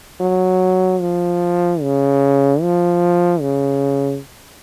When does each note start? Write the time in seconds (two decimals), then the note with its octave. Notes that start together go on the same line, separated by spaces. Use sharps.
0.20 F#3
1.01 F3
1.82 C#3
2.61 F3
3.41 C#3